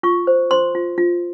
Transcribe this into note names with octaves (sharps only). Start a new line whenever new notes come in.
F4 C#6
C5
C5 C6
F4
F4